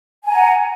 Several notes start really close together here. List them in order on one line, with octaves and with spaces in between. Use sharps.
G#5 A#5 F#5